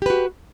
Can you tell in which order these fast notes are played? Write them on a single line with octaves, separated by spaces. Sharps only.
G4 B4 F#4